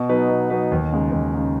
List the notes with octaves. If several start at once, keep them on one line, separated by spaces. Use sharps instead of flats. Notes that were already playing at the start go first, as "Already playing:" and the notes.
Already playing: B2
F#3 B3 D#4 B4
B2
F#3 B3 D#4 B4
D#2
C#3 G#3 D#4
D#2
C#3 G#3 D#4